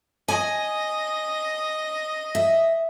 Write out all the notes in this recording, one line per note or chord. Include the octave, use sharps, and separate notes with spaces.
D#5 G#5
E5